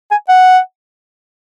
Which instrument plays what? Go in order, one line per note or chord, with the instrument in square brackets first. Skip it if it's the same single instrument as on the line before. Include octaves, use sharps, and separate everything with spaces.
[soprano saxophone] G#5
F#5